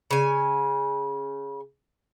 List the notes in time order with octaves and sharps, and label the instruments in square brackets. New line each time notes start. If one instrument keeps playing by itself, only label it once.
[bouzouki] C#3 G#5